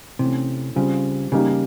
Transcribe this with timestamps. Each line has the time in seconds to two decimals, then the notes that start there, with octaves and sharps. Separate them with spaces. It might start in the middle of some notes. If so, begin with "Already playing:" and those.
0.19 C3 E3 A3 C#4
0.76 C#3 G3 C4 F4
1.32 C#3 G3 A#3 D#4 G4